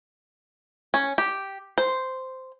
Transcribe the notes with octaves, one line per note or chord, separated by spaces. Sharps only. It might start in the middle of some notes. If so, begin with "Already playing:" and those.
C#4
G4
C5